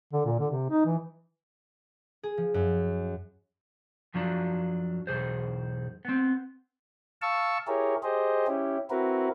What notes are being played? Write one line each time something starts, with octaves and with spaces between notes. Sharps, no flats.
D3
A#2
D3
C3
D#4
E3
G#4
F3
F#2
F#2 F3 F#3 D4
B1 E2 B2 G#4 C5
B3 C4
F5 A5 C#6 E6
E4 G4 G#4 A#4 C#5
G4 G#4 C5 D#5
C#4 E4 G4
C4 E4 F#4 A#4 B4